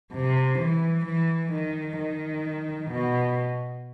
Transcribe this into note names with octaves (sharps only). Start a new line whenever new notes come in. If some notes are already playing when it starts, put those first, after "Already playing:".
C3
E3
E3
D#3
D#3
B2